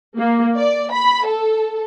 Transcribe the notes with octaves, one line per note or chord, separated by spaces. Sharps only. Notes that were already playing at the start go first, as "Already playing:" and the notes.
A#3
D5
B5
A4